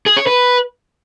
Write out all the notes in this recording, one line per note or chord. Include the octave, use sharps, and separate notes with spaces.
G#4
C#5
B4